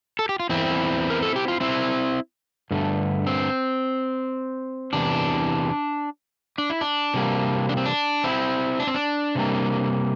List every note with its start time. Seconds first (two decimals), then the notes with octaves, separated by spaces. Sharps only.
0.19 A4
0.29 G4
0.40 F4
0.49 E2 E3 A#3 C4 E4
1.10 A#4
1.23 A4
1.36 G4
1.48 F4
1.61 C4 E4
2.71 G2 D3 A3
3.27 C4
4.93 E2 C3 E3 D4
6.58 D4
6.70 E4
6.81 D4
7.14 C3 G3 A#3
7.69 D4
7.77 C4
7.86 D4
8.24 C4 E4
8.80 D4
8.87 C4
8.94 D4
9.35 C3 G3 A#3